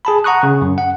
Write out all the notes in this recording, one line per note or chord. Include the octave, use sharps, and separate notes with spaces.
G#4 A5 B5
F#5 A#5 C#6 D#6 F#6
C#3
F#2
F#5